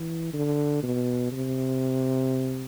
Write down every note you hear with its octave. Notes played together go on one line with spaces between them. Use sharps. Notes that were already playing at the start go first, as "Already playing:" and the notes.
Already playing: E3
D3
B2
C3